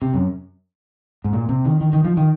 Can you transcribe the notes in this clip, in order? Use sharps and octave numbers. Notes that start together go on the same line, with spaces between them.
C3
F#2
G#2
A#2
C3
D#3
D#3
D#3
F3
D#3